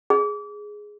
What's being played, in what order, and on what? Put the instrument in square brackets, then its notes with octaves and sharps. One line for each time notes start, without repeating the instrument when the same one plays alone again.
[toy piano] G#4